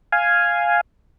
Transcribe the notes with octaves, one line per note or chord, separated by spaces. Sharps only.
F5 G#5